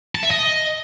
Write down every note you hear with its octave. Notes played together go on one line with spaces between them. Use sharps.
A5
E5
D#5